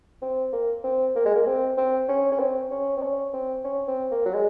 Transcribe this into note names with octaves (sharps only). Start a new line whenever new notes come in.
C4
A#3
C4
A#3
G#3
A#3
C4
C4
C#4
C#4
C4
C#4
C4
C#4
C4
C#4
C4
A#3
F#3
G#3